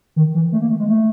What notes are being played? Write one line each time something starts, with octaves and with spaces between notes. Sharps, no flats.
D#3
E3
A3
A#3
A3
G#3
A3